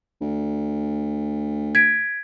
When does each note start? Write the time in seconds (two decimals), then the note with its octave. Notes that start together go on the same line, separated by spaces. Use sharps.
0.21 D2
1.75 G#6 B6 D7